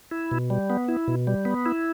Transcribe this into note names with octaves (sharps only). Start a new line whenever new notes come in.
E4
B2
G3
B3
E4
B2
G3
B3
E4